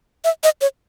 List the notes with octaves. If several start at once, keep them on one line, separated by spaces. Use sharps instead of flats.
E5
D#5
C#5